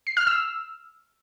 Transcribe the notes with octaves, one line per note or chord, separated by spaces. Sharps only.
C7
F6
E6